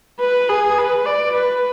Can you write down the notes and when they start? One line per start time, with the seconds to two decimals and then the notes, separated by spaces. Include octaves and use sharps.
0.20 B4
0.49 G#4
0.78 B4
1.05 D5
1.34 B4